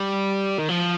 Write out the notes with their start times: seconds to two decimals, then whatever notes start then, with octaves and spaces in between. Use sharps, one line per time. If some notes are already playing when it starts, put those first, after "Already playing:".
Already playing: G3
0.59 D#3
0.69 F3